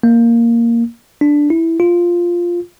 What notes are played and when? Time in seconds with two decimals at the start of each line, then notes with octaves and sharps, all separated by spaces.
0.03 A#3
1.21 D4
1.50 E4
1.80 F4